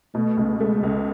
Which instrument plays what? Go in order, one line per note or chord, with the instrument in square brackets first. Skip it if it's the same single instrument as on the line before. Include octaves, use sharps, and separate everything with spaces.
[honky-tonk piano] B2 [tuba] A3
[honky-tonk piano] C#2
[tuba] G#3 [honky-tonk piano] A3
[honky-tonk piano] C#2